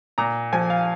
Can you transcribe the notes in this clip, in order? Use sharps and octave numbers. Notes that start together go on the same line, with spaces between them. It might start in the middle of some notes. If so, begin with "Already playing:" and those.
A#2 A#5
F3 G#5
F5